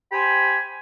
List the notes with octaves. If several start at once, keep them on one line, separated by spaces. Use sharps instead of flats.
G4 C5 G#5 B5